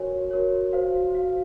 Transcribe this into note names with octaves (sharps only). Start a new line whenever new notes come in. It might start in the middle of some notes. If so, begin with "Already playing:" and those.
Already playing: F#4 A#4 C#5 G#5
F#4 A#4 C#5
F#4 C5 F5
F#4 C5 F5